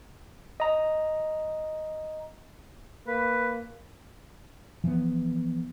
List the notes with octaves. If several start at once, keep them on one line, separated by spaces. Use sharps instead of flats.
D#5 A#5
A#3 B4
E3 F3 A#3 B3